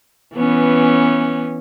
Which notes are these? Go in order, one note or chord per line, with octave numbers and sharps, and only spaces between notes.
E3 B3 C#4